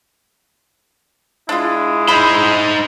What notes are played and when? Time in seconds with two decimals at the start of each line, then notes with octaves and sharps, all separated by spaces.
1.49 G#3 D4 E4 F4 D#6
2.08 D4 D#4 C5 B5